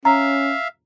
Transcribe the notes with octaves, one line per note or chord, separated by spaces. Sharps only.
C#4 E5 F5 A#5